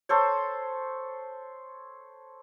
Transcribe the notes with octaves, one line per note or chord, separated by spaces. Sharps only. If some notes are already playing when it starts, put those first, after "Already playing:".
A4 C5 C#5